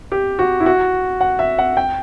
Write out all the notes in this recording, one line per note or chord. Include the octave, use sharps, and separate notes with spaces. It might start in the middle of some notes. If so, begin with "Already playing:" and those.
G4
F#4
E4
F#4
F#5
E5
F#5
G5